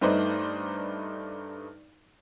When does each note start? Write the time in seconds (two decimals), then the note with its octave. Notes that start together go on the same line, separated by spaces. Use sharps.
0.01 G2 A3 D#4 B4 C5 D5